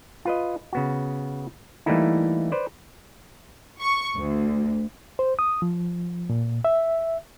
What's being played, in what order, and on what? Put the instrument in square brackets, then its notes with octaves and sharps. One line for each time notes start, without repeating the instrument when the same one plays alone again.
[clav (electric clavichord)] F4 B4 D#5
C#3 B3 F#4
E3 G3 A3 A#3 D#4 E4
B4 C5 D5
[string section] C#6
D2
[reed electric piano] C5
D#6
F3
A#2
E5